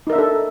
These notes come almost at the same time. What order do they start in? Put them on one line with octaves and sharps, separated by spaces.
D#4 A#4 E5 D4 A4